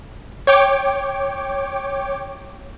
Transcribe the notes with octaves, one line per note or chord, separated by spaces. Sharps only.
C#5 G5 D6